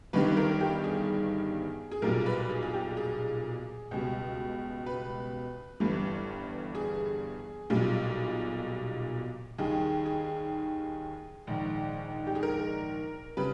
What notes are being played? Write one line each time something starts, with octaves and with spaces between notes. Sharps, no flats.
G1 G2 D#3 G3 B4
A#4
G4
G#4
G#4
B1 A#2 G3 A#4
B4
G#4
G#4
G4
G#4
C#2 B2 G3
B4
G1 G2 E3 G3
G#4
B1 A#2 G3
D#2 D#3 G3 G#4
G#4
A#1 G#2 D#3
G4
G#4
A#4
C#3 G3 B4